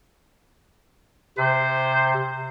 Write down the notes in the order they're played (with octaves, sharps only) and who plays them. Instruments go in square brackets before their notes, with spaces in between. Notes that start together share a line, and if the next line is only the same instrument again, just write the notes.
[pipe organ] C3 [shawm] C5